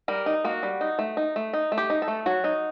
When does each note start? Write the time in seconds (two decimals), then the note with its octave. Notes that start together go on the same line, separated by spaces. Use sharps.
0.08 G3 A#4
0.26 D#4
0.45 A#3 F#4
0.63 G3
0.81 D#4
0.99 A3
1.17 D#4
1.36 A3
1.53 D#4
1.72 A3
1.77 G4
1.90 D#4
2.02 A4
2.08 A3
2.26 F#3 F#4
2.44 D#4